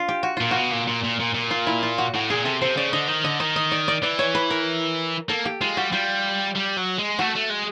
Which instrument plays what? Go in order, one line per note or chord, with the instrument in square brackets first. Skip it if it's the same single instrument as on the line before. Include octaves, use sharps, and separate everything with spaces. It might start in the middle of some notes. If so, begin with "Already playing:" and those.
Already playing: [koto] D4 F4
G4
F#4
[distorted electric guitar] A#2 [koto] F4
[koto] F#4
[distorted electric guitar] B2
A#2
A#2
A#2
A#2
A#2
[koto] F4
E4
F4
F#4
[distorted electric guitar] A2 [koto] F#4
[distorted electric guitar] A#2 [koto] G#4
[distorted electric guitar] C3 [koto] A4
[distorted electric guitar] C3 [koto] C5
[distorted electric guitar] C#3 [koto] D5
[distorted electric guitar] D3 [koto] D#5
[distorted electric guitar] D#3
[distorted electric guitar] D3 [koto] D#5
[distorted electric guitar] D#3 [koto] D#5
[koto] D#5
D5
D5
[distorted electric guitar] E3 [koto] D5
[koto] C#5
B4
A#4
[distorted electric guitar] A#3 [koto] A4
[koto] G4
[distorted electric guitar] G#3 [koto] F4
[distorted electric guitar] G3 [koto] F#4
[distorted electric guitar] G3 [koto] F4
[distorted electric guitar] G3
F#3
G#3
[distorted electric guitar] A3 [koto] F#4
[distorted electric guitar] A3
G#3